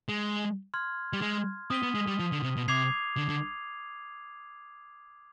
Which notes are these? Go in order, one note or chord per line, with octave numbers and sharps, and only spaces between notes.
G#3
C6 F6 G#6
G3
G#3
C4 D#6 B6 D#7 G7
B3
G#3
G3
F3
D3
C3
B2
C3 D6 G#6 C7 F7
D3
D3